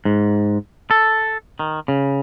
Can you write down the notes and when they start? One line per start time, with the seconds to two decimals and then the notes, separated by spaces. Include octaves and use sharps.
0.05 G#2
0.91 A4
1.59 D#3
1.88 C#3